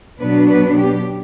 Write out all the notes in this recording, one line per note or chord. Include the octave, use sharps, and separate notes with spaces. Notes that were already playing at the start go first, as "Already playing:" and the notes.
B2 F#3 B3 D4 B4
B4
G4